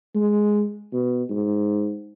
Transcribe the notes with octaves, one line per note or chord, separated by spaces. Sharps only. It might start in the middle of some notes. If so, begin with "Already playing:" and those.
G#3
B2
G#2